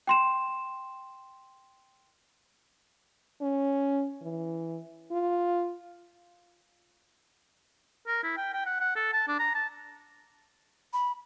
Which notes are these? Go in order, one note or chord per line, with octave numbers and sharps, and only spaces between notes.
G5 C6 E7
C#4
E3
F4
A#4
E4
G5
G5
F#5
F#5
A4
A5
D4
A#5
A5
B5